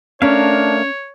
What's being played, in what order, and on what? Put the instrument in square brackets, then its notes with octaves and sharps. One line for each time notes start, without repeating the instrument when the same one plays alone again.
[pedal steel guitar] A3 A#4 F5 [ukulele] C#4 [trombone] D4 [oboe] C#5